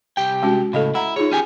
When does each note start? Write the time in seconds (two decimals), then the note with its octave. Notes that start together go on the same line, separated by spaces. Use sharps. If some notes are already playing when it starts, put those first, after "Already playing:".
0.17 C2 G4 G5
0.43 G#3 C#4 F#4
0.73 A2 C#3 A4 D#5 F5
0.95 E4 F#5 A#5
1.16 D#4 F4 G#4 C#5
1.32 C#4 G4 G#5